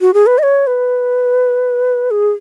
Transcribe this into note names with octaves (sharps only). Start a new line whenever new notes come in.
F#4
G#4
B4
D#5
C#5
B4
G#4